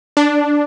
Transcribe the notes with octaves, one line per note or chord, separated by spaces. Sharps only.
D4